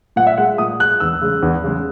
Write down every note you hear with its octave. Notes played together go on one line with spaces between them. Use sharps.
A#2 F#5
E5
G#3 F#5
A#2 D#6
G#3 F#6
E2 E6
C#3 G#3
E2
C#3 G#3